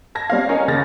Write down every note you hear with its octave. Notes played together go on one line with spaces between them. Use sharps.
A5 G#6 A#6
G3 C4 C#5 F5
C#4 A#4 D#5 F5
D#2 C#3 A6 A#6